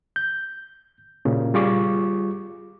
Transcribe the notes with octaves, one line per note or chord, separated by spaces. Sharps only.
G6
A#2 C#3
G3 F4 G#4 C#6 D6